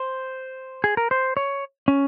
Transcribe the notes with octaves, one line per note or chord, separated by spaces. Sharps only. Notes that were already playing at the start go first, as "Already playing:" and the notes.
Already playing: C5
G#4
A#4
C5
C#5
C#4